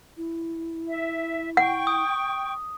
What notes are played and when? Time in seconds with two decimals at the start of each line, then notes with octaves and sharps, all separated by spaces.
0.17 E4
0.88 E5
1.57 F#5 G5 C#6
1.87 D#6